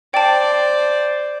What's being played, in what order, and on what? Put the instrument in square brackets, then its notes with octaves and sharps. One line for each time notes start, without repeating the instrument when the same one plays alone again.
[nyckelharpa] C5 D5 [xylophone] G5 A5